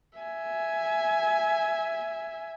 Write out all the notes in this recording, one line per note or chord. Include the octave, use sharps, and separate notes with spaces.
E5 G#5